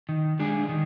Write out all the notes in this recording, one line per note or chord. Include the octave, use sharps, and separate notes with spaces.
D#3
G#3 D4 G#4
D#3